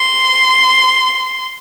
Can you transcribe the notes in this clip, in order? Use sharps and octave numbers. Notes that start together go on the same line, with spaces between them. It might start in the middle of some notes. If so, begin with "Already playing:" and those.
Already playing: C6